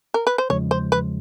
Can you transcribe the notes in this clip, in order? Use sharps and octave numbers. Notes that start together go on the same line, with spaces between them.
A#4
B4
C5
E2 C#3 F3 G#3 C#5
C5
B4